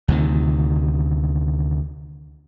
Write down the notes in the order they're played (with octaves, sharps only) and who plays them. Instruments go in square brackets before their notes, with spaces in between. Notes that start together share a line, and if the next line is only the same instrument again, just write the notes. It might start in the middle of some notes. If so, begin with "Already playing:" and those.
[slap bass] D2 C3 D#3